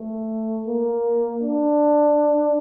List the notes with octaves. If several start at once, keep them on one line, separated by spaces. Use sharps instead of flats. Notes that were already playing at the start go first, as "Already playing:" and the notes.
Already playing: A3
A#3
D4